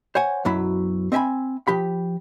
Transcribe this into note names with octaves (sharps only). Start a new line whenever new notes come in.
C5 C#5 F#5 G#5
B1 F#2 F#3 E4 B5
C4 D#5 E5 G#5 B5
F3 G4 B5